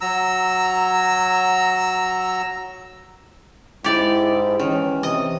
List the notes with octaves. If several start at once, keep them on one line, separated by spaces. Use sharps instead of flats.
F#3 A#5 E6
G#2 E4 G4 D5
D#3 E3 C#4
C3 D#5